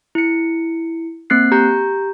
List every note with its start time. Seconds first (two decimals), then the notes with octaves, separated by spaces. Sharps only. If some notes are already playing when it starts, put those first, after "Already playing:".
0.15 E4 C#7
1.30 A#3 C4 F#6 C7
1.52 G4 A#5 G6